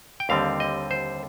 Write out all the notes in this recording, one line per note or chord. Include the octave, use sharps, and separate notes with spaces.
G5
D#2 D3 G3 C4 F5
D#5
C5